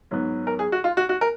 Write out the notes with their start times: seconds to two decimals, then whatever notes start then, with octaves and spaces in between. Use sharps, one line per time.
0.11 G#2 F#3 B3
0.47 A#4
0.59 G#4
0.72 F#4
0.84 F4
0.97 F#4
1.09 F#4
1.21 A#4